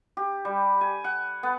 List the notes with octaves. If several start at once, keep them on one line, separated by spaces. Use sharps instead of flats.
G4
G3
G#5
F#5
B3